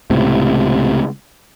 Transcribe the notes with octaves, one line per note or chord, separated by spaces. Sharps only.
C#2 A2 C3